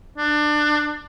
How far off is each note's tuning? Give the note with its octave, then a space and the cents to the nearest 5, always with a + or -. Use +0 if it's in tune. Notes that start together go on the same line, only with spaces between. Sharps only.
D4 +25